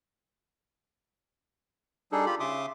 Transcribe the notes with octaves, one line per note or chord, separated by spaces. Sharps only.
G3 D4 D#4 G#4 A4
F4 G4 B5
C#3 E5 C6 D6 D#6